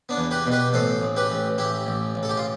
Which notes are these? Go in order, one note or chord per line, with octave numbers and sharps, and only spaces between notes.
B3 D4
E2
G4 B4
B2
G4 B4
A1 A4 C5
A1
G4 B4
A1
A1 E4 G4
A1
A1
A4
G4
F4